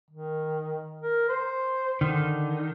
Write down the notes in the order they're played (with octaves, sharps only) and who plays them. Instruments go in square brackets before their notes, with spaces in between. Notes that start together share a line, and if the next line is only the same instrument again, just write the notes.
[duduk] D#3
A#4
C5
[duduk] D3 [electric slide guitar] D#3